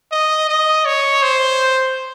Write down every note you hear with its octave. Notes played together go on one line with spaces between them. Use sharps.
D#5
D#5
C#5
C5